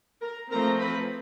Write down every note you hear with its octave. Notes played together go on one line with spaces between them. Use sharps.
A#4 A#5
F3 A3 C4 A#4 A#5
B4 B5